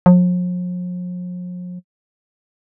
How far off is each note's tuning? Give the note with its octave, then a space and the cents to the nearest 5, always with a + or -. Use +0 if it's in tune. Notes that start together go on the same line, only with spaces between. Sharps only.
F3 +45